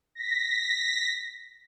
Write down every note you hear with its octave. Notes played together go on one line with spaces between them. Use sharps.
A#6 B6